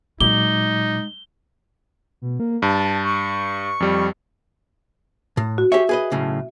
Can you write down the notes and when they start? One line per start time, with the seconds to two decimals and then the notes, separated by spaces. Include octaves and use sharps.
0.21 A#2 F#3 G#3 D#4 D6 G7
2.22 B2
2.40 A#3
2.62 G2 A5
3.05 C#6
3.80 F2 G3
5.37 A2
5.58 F#4
5.72 G4 G#4 C#5 E5
5.89 G#4 B4 D#5
6.12 B1 A2 C#3